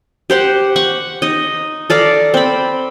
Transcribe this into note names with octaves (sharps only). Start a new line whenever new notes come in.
G4 C5 F#5
F#5 C#6
D#4 D#5
A4 D5 F5 A#5
C4 B5